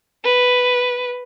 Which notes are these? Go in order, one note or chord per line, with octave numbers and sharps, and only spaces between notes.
B4